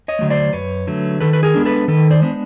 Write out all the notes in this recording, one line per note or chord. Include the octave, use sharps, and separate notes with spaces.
C#5 D#5
D3 F#3 A3
C5 D5
F#2 B4 C#5
D3 F#3 A3
D#3 A4 B4
B4
G#4 A#4
G#3 B3 D4
A4 B4
D#3 A4 B4
C5 D5
G#3 B3 D4